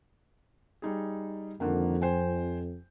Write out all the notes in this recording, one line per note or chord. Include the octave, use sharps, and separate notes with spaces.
G3 D#4 G#4
F2 D3 D#3 A#3
C5 G5 G#5